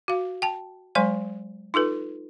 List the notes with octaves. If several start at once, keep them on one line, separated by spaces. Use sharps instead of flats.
F#4 F5
G5 A5
F#3 G#3 C5 G#5 C6
D#4 F4 A4 B4